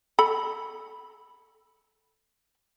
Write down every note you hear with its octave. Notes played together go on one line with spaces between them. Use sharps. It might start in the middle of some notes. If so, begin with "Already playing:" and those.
A4 B5